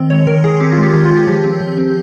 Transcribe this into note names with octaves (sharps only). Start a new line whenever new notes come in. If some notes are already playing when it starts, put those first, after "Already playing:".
Already playing: D#3 C4
G#3 C#5
D#3 A#4
D#3 G#4
C4 G4
F4
G#3
G4
D#3 G4
F4
D#3
G4
F3 G4
C4
F3
C4